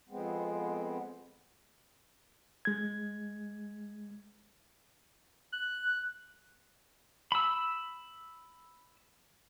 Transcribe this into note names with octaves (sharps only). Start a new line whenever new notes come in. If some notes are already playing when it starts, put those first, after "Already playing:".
F2 G#3 B3 C4
G#3 G#6
F#6
B5 E6